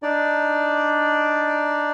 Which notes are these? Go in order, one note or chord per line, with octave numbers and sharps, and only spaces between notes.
D4 D#4 D5